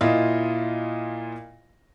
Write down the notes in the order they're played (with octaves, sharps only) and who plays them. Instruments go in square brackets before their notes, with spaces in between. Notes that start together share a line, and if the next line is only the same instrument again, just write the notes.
[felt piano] A#2 E4 F4 D#5